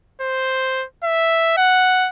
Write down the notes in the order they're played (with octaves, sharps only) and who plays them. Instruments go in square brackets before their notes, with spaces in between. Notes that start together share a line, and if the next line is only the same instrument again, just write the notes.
[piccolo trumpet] C5
E5
F#5